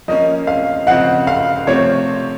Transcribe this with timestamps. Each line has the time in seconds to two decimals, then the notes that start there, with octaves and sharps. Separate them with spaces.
0.08 F3 A#3 C#4 D#5
0.47 F5
0.87 C#3 F3 C4 D#4 F#5
1.27 F5
1.67 C3 F3 A3 C4 C#5